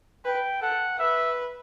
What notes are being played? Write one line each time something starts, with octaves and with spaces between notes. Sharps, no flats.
B4 G5
A4 F#5
B4 E5